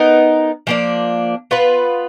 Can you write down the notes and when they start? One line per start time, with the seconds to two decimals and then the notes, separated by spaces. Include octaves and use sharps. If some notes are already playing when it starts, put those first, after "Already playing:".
Already playing: B3 D#4 A#4
0.67 F3 A#3 D4
1.51 B3 F4 B4